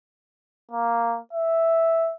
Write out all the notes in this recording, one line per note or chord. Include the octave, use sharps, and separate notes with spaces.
A#3
E5